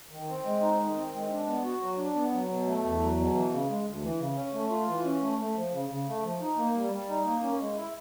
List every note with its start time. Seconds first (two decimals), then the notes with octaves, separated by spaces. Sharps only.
0.11 D#3
0.28 C4
0.45 G#3
0.62 D#4
0.80 D#3
0.97 C4
1.13 G#3
1.31 D4
1.47 B3
1.64 F#4
1.81 F#3
1.98 D4
2.15 B3
2.33 F#3
2.49 B2
2.66 A3
2.83 E2
3.00 F#3
3.18 B2
3.34 E3
3.51 C#3
3.69 G#3
3.85 D2
4.02 E3
4.19 C#3
4.36 C#4
4.53 A3
4.70 F4
4.88 E3
5.05 C#4
5.22 A3
5.39 A3
5.55 F3
5.72 C#3
5.89 C#3
6.07 A3
6.23 F3
6.41 D#4
6.57 A#3
6.75 G3
6.92 G3
7.09 D#4
7.25 A#3
7.43 C#4
7.60 G#3
7.76 E4